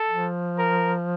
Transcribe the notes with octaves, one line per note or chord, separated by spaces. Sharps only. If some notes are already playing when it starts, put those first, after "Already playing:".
Already playing: A4
F3
A#4